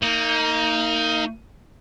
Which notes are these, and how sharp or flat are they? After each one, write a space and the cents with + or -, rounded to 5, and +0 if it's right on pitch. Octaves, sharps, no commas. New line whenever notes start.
A#3 -25 D#4 +15